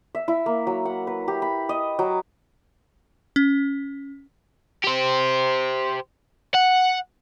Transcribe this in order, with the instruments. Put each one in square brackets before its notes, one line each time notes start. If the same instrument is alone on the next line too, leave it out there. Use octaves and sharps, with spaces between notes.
[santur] E5
E4
A#3
F#3
F#5
B4
G4
B5
D#5
F#3
[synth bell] C#4
[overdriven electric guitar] G4 C5
F#5